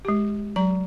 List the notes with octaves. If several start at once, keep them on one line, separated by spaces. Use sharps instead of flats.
G#3 G4
F#3 A#5